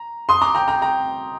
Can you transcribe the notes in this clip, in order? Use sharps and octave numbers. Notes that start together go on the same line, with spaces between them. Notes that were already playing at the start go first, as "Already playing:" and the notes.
Already playing: A#5
C6 D#6
A#5 D6
G5 A#5
G5 A#5
G5 A#5